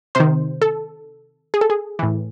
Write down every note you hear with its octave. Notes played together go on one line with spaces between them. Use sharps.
C3 D#3 C5
A4
G#4
A4
G#4
A2 E3